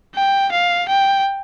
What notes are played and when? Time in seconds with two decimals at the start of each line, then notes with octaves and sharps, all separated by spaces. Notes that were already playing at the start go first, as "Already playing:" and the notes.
0.15 G5
0.51 F5
0.88 G5